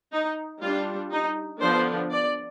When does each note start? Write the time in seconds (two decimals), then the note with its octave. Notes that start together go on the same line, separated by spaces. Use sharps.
0.12 D#4
0.61 G3 D4 F4
1.11 D#4
1.61 D3 F3 B3 D4 C5
2.11 D5